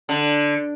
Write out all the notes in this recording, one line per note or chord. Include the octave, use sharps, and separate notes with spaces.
D3